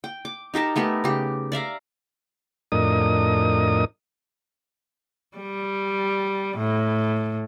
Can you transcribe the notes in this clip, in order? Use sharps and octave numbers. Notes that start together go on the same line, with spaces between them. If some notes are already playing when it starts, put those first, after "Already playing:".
G5
D6
D#4 G4 A#4 A5
A3 B3 G4 A#4
C#3 G4
D5 E5 F5 A#5
F2 A2 D4 A#4 D#5 D#6
G3
A2